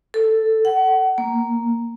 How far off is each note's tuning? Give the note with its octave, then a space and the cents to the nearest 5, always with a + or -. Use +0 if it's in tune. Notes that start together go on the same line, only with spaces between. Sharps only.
A4 +5
F#5 +30
A#3 +0